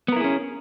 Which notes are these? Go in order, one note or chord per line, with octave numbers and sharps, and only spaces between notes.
B3 C#4 E4 G#4 A#4